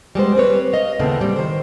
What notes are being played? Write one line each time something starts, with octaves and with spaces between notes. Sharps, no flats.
G3 G#3 B3 C5
G3 C4 B4 C#5
D#5 F5
D#2 A2 C#3 A3 B3 C4
G3
D#3 C5